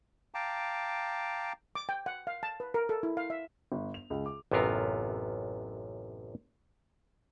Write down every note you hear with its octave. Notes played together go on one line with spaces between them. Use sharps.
F5 G5 A5 A#5 D6
D6
G5
F#5
F5
A5
B4
A#4
A4
E4
F5
E5
G1
F7
C#2
D6
A1 F#2 C3 B3 F4 A#4